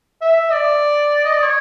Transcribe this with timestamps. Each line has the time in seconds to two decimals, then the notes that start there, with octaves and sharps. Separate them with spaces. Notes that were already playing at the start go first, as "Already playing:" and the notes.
0.21 E5
0.52 D5
1.25 D#5
1.34 D5
1.43 C#5